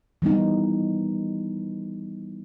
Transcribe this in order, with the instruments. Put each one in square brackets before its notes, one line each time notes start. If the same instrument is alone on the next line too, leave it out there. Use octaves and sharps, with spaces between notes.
[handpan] E3 G3 B3 D#4